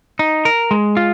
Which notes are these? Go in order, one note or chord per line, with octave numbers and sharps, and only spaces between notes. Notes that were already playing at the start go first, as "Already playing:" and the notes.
D#4
A#4
G#3
F4